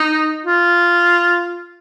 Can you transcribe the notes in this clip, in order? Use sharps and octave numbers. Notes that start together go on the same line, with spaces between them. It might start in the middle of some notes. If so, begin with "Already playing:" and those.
Already playing: D#4
F4